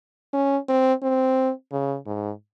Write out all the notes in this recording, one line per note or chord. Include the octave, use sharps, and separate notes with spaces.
C#4
C4
C4
C#3
G#2